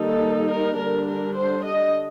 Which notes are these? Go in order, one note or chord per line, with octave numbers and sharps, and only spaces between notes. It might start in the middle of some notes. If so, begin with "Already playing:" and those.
Already playing: D#3 G3 A#3 D#4 A4
A#4
D3 G3 D4 A#4
A#4
C5
D#5